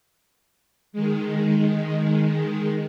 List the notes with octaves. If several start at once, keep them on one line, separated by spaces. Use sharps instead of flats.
D#3 G#3